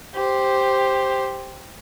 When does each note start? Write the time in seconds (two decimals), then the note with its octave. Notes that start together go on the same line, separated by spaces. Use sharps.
0.15 G4 C5